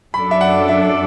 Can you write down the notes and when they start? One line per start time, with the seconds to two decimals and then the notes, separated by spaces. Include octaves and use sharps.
0.14 F#2 F#3 D4 A4 D5 B5
0.31 E5
0.41 F#5
0.69 E5